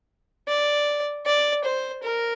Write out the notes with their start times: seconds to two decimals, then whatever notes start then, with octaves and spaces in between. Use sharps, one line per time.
0.48 D5
1.26 D5
1.65 C5
2.04 A#4